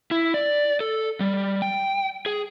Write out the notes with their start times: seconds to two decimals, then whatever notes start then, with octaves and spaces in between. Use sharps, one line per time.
0.11 E4
0.34 D5
0.80 A4
1.20 G3
1.62 G5
2.26 G#4